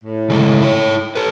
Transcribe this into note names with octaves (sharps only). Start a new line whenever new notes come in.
A2
C#3 G#3 A3
E4 C#5
A4 B4 C#5